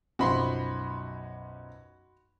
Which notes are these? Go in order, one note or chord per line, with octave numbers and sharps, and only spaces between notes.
B1 F#2 F3 F#4 B5 C6